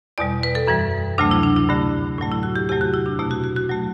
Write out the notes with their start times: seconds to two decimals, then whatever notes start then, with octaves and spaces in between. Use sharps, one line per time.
0.18 E2 B2 G3 D5
0.43 B4
0.55 A4
0.68 F#2 E3 G3
1.18 D2 C3 F#3 A3 D4
1.31 E4
1.43 D4
1.56 E4
1.69 G2 D3 A3
2.18 A2 F#3 A3
2.32 E4
2.43 F#4
2.56 G4
2.69 E2 C3 F#3 A3 G4
2.81 F#4
2.94 E4
3.06 D4
3.19 B2 A3 E4
3.31 F#4
3.44 F#4
3.56 F#4
3.69 F#3 A3